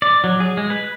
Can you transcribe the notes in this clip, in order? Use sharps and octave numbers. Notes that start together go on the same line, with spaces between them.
D5
F#3
G#4
G#3
B4